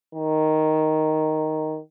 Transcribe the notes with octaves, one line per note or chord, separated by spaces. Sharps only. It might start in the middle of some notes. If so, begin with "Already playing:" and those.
D#3